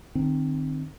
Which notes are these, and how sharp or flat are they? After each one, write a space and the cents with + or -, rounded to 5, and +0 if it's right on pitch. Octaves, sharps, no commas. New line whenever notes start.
D#3 -35 C4 +0